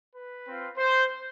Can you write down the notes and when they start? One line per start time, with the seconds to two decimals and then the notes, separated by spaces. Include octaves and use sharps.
0.15 B4
0.46 C4 F4
0.77 C5